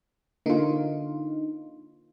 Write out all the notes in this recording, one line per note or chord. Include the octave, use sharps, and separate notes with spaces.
D3 A#3 D#4 F4